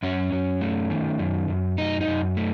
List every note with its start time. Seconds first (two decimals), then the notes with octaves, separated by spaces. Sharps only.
0.03 F#2 C#4
0.32 F#2
0.61 A3
0.90 D#3
1.19 F#2
1.48 F#2
1.78 F#2 D#4
2.01 D#4
2.08 F#2
2.37 A3